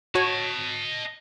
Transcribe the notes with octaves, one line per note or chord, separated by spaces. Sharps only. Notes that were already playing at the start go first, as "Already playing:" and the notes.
F#4 C#5 D#5 A5